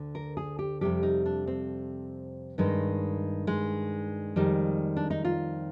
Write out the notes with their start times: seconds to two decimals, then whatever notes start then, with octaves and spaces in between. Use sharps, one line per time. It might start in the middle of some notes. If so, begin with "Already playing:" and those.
Already playing: D2 D3
0.15 A#4
0.37 G#4
0.59 G4
0.81 F2 C3 G3 G4
1.03 D#4
1.26 D4
1.47 C4
2.58 G2 D#3 G#3
3.47 G#3
4.36 F2 D#3 G3
4.96 D4
5.10 D#4
5.25 F4